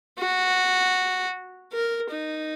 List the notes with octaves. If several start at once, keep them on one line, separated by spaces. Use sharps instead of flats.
F#4
A#4
D#4